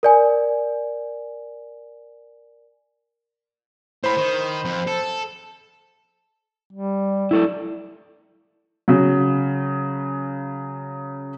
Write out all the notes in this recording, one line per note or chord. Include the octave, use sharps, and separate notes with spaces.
A#4 D5 G#5
A2 C5 B5
D#3
F2
A4
G3
E4 A4 D5
C#3 F#3